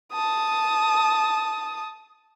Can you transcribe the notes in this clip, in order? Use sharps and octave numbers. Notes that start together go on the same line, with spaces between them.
A5 D#6